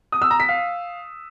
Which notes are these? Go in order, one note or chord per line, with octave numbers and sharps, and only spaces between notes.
D#6
E6
A#5
B6
F5